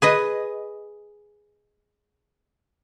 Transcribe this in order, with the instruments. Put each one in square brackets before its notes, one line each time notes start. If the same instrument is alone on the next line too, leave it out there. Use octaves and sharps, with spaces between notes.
[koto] G#4 B4 D#5